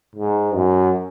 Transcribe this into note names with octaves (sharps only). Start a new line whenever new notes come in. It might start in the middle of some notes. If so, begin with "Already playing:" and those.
G#2
F#2